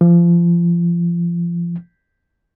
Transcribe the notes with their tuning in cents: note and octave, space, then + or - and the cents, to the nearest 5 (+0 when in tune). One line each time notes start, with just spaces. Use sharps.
F3 -30